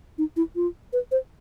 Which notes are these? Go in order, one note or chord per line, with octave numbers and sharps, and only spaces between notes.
D#4
E4
F4
B4
C5